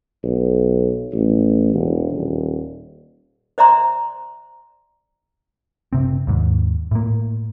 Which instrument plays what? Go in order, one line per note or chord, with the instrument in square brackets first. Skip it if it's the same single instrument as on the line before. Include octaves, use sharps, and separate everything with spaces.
[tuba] B1
A1
E1
D#1
[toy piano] C5 D5 E5 A#5 C6
[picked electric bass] F#1 C3 C4
D#2 G#2
A2 A#3